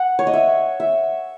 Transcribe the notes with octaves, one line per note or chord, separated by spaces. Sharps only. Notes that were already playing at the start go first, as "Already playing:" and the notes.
Already playing: F#5
C#5
D#5
E5
E5